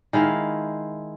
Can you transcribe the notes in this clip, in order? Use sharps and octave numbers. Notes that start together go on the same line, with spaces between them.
D#3 G#3 E4 F5